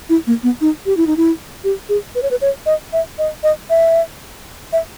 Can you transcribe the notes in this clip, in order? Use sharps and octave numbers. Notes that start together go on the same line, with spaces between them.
E4
A#3
B3
D#4
G4
E4
D#4
E4
G4
G#4
B4
C#5
B4
C#5
D#5
E5
D#5
D#5
E5
E5